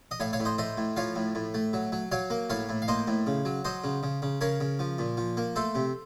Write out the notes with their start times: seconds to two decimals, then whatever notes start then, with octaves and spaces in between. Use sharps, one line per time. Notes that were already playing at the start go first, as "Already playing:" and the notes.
0.11 D#5
0.20 A2 C#5 F5
0.33 C#5 F5
0.40 A2
0.45 C5 D#5
0.58 A3 C5 D#5
0.77 A2
0.96 F3 C#5 F5
1.16 A2
1.35 A2
1.54 A3
1.73 F#3
1.92 F#3
2.11 F#3 C#5 F5
2.30 A#3
2.50 A2 C#5 F5
2.69 A2
2.82 F5
2.88 A#3 C5 D#5
3.07 A2
3.27 C#3
3.45 F#3
3.65 F#3 C5 D#5
3.84 C#3
4.03 C#3
4.22 C#3
4.41 C#3 A#4 C#5
4.60 C#3
4.79 F3
4.98 A#2
5.17 F3
5.37 A#3
5.56 A3 A4 C5
5.75 C3